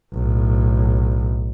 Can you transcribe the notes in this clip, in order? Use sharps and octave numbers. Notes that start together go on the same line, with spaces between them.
B1 A2